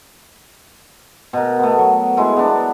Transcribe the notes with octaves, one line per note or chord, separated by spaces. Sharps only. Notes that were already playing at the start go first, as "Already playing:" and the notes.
B2 A#4
A3 B3
F#3
F#3 G#3 E4
B3 D4